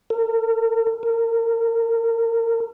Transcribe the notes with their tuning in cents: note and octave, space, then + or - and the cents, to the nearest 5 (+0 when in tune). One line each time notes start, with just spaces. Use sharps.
A#4 -40
A#4 -25